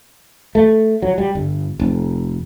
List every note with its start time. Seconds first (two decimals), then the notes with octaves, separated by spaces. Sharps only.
0.55 A3
1.02 F#3
1.18 G3
1.35 G1
1.80 F1